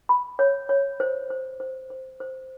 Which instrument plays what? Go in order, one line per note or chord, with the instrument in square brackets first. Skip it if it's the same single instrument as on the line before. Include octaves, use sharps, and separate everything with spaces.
[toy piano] B5
C#5
C#5
C5
C5
C5
C5
C5